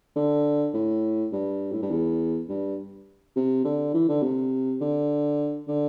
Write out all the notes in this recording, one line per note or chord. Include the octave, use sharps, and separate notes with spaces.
D3
A2
G2
A2
G2
E2
G2
C3
D3
E3
D3
C3
D3
D3